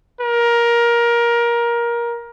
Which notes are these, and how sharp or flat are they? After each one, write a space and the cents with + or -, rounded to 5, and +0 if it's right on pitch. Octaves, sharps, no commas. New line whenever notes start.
A#4 +20